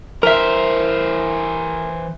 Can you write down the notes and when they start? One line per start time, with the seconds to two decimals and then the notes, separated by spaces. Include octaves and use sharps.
0.23 E3 A#4 C5 E5